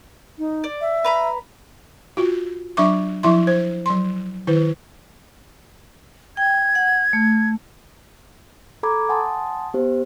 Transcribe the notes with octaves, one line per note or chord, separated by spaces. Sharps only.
D#4
D5
E5
B4 A#5 B5
F4 F#4
F#3 D4 E5 C#6 D6
F3 E4 E5 C6
C5
F#3 C6
D#3 E4 B4
G5 G#6
F#5
A3
A4 A#5 B5 D6 G#6
F#5 G#5 A5 C6 D#6
B3 G4 C5